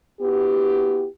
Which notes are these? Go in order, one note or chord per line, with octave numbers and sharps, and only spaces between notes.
B3 E4 F#4 G4